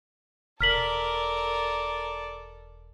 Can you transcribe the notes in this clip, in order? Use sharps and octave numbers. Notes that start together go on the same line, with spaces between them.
E1 A4 A#4 D5 F6 B6 F#7